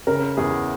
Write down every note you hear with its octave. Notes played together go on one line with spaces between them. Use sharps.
C#3 A#4
E2 G#4